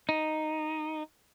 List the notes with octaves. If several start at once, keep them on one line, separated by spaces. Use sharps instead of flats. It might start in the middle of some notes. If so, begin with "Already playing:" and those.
D#4